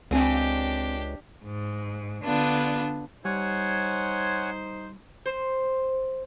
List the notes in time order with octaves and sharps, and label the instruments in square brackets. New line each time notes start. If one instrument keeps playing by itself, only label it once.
[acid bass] C#2 [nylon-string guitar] C4 G#5 [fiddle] D4 G4
[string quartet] G#2
D3 B3 D4 F4
[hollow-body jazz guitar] G3 [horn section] D#4 C5 [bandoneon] C#5 F#5 G#5
[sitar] C5